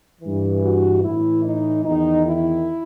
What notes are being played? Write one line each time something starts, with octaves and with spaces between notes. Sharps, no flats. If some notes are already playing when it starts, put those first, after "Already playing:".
G2 E3
F#4
A2 E3 E4
D#4
E2 D#3 D#4
E4